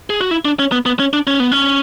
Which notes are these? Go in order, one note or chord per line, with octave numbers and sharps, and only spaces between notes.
G#4
F#4
E4
D4
C#4
B3
B3
C#4
D4
C#4
B3
C#4